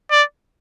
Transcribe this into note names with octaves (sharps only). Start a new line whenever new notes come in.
D5